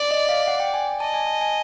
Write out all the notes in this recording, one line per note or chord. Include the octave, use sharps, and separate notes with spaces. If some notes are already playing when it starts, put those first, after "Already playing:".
Already playing: D5
D#5
F5
F#5
G5
G#5
D#5 A5
G#5
A5
G#5